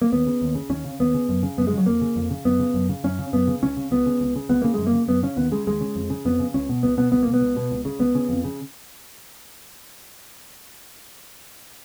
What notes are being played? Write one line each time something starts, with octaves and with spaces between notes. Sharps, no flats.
A#3
D#2 B3
C#3
D#2
C#3
D#2 C#4
C#3
D#2 B3
C#3
F#2
C#3
F#2 B3
G#3
C#3
F#3
F2 A#3
C#3
F2
C#3
F#2 B3
C#3
F#2
C#3
F#2 C#4
C#3
F#2 B3
C#3
C#2 C#4
C#3
C#2 B3
C#3
C#2
C#3
C#2 B3
C#3 A#3
F#2 G#3
A#3
C#3
F#2 B3
C#3 C#4
D#2 B3
C#3 G#3
D#2 G#3
C#3
F2
C#3
F2 B3
C#3
C#2 C#4
B2
C#2 B3
B2 B3
C#2 B3
B2 A#3
B3
C#2
B2
C#2
C#3
C#2 B3
C#3
F2
C#3